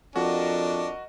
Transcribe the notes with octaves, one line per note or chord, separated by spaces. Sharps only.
F2 D4 F#4 A#4 D#5